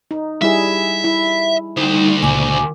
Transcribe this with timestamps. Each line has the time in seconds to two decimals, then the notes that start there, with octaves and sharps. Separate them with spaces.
0.11 D#4
0.42 G3 E4 G#4 E5
1.04 E4
1.77 D2 G3 D#4 C5
2.23 C#2 A#2 G#5 D6